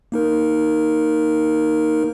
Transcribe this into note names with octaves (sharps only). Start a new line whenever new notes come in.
A#3 D#4 A#4